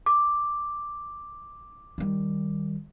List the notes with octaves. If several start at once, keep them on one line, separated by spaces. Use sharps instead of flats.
D6
D#3 G3